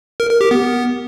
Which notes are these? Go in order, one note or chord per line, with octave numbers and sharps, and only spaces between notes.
A#4
A#4
G4
B3